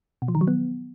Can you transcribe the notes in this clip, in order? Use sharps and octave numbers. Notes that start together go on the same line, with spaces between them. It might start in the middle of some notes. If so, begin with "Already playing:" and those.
B2
F3
D#3
F#3
B3